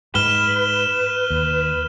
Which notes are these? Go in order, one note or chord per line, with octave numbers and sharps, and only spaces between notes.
G#2 G#3 B4 F6 E7 G7
D#2